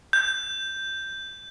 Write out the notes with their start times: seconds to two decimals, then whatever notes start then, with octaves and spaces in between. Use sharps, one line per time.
0.13 G6